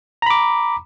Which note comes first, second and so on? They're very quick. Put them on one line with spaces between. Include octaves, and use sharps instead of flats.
A#5 B5 D6